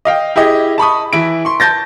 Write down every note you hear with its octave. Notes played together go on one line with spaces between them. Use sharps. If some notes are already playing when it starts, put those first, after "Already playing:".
D#5 F5 G5
E4 G4 G#4 D#5
A5 B5 C#6 D#6
E3 E4 D7
C6 C#6
A5 G6 A6 A#6